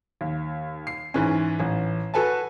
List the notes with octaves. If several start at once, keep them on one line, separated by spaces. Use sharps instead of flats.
D#2
C7
G#2 E3 C#4
A1
F#4 A4 B4 G#5 A5